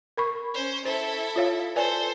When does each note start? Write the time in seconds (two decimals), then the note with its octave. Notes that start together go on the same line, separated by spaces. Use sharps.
0.17 A#4 B5 C#6
0.54 C#4 C5
0.85 E4 A4 C5
1.36 F4 C#5 F5
1.76 A4 B4 C5 D5 G#5